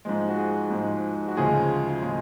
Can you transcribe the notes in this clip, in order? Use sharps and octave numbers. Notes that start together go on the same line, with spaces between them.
G#2 F3 G#3
F#4
G#4
G#2 F3 G#3
F#4
D2 C#3 F3 G#3 G#4
C#3 F3 G#3